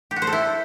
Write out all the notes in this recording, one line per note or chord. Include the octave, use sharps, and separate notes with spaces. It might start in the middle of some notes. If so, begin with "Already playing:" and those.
G4
F#4
C5
A4
E4